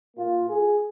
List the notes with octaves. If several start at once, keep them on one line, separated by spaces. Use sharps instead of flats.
A#2 A#3 F4
G#4